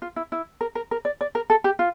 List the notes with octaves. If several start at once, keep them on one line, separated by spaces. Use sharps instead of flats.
F4
E4
E4
A#4
A#4
A#4
D5
D5
A#4
A4
G4
F4